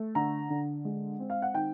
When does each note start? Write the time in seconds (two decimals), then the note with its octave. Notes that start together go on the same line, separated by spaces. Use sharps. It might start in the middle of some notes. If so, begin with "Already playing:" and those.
Already playing: A3
0.15 D3 A#5
0.50 D3
0.85 G#3
1.20 C4
1.30 F5
1.42 F#5
1.54 D#3 G5